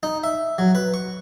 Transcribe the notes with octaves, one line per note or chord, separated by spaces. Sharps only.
D#4
E5
F#3
B4
C#6